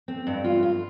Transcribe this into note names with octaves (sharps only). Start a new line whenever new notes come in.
C4
G2
F4
F4